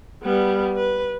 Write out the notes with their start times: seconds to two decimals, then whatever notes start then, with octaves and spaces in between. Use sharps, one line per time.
0.23 G3 B3
0.76 B4